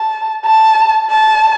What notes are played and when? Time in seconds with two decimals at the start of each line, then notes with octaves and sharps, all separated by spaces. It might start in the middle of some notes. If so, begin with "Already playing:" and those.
Already playing: A5
0.45 A5
1.10 A5